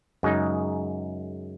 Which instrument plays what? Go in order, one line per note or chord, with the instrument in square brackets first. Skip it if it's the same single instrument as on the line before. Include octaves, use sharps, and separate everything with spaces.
[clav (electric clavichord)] F#2 C#3 G#3 D#4